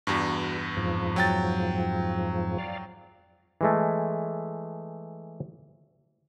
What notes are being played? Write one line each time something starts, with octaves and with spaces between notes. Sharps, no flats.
E2 G2 F#4
F2 G#2 F3
F#3 G5 A6
D5 F5
E3 G#3 A3